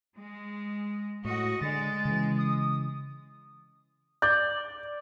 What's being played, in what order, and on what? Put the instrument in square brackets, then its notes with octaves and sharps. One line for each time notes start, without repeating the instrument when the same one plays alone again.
[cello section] G#3
[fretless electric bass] A2 [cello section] F#4 D#5
[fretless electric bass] D3 [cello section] G#3 [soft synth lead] A6
[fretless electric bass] C#3 E3
[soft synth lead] D#6
[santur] D5 [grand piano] G6